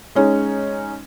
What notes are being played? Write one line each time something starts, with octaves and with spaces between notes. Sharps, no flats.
G#3 C#4 D#4